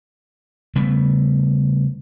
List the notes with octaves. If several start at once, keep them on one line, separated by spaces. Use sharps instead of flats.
C#3 G3 A3 B3